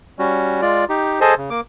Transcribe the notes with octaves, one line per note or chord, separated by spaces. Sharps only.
G3 C#4 F#4
G#3 F4 D5
D#4 G4
G#4 A4 C5 D#5 G#5 A5
C#3
A#3 D6